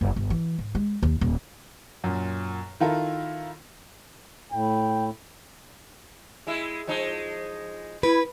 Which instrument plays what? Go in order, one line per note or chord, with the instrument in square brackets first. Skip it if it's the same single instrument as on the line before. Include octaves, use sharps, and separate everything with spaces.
[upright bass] F#1
G1
E3
G#2
G#3
D#2
D#1
[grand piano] F#2 A#2
D#3 E4 F4 A4 A#4
[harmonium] A2 [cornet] G5
[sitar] G#3 E4
F3 G#3 D#4
[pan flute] E4 [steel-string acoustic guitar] B4